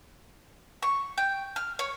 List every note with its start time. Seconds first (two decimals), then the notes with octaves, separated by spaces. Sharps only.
0.82 C#6
1.18 G5
1.56 F6
1.79 C#5